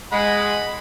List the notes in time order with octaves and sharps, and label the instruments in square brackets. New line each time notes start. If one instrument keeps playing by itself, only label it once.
[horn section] G#3 [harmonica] F#5 B5